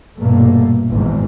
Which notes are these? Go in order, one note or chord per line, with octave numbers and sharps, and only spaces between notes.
A#1 G2 B2 A3 A#3
G#1 E2 G#2